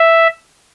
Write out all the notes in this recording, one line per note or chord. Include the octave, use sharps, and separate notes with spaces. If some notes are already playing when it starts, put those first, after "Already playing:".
Already playing: E5